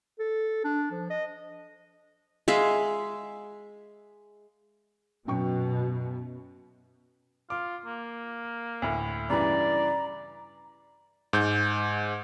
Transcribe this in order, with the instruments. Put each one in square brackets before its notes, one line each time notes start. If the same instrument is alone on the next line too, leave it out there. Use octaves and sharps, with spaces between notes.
[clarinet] A4
D4
F3
D#5
[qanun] G#3 E5 F5
[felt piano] F#2 G5 C#6 [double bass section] B2
[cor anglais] F4 [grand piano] D6
[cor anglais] A#3
[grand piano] D2 A2
[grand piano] G2 C#3 E3 [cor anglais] D5 [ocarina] A#5
[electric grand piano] G#2 G6